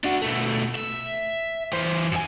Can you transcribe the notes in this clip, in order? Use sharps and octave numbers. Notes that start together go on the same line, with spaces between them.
D4 F#4
B2 A3
E5
E3 C5
F#2 G#5